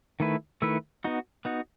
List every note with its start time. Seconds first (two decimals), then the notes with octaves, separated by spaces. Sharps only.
0.20 D#3 A3 E4 B4
0.62 D#3 A3 E4 B4
1.04 B3 D#4 F#4
1.45 B3 D#4 F#4